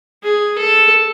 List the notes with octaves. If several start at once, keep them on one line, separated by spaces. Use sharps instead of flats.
G#4
A4